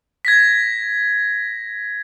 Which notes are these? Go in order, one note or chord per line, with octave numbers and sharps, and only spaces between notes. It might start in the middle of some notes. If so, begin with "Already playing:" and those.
G#6 A#6 B6